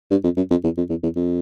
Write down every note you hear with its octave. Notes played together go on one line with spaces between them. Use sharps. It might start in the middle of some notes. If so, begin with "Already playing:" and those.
G2
F2
F#2
F2
E2
F2
E2
E2
F2